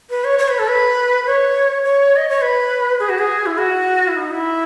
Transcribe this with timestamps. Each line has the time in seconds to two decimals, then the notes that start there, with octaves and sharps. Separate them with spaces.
0.10 B4
0.24 C#5
0.39 C#5
0.49 B4
0.59 A4
0.68 B4
1.26 C#5
1.84 C#5
2.16 D#5
2.29 C#5
2.42 B4
3.00 G#4
3.09 F#4
3.19 G#4
3.46 E4
3.58 F#4
4.08 E4
4.16 D#4
4.31 E4